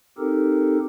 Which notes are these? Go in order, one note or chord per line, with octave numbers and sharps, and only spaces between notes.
C4 D#4 G4 A4 A#4